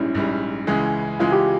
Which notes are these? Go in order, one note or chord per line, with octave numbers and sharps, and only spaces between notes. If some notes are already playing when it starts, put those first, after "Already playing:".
Already playing: A#1 G#2 G3 C#4 E4
A#1 G#2 G3
C#2 C#3 E3 G#3
C#2 C#3 E3 G#3 F4
G4